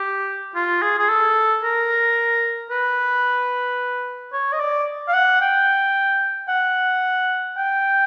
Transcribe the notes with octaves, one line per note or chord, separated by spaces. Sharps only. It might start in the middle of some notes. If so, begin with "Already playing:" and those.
Already playing: G4
F4
G#4
G#4
A4
A#4
B4
C#5
D#5
D5
F5
F#5
G5
F#5
G5